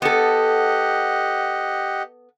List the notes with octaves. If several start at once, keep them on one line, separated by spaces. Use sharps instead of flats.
B3 G4 A4 D#5 F#5